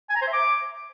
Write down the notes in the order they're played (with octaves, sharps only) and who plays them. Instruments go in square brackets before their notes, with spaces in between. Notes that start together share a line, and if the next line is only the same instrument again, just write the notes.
[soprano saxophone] G#5
A#5
C5
E5
D6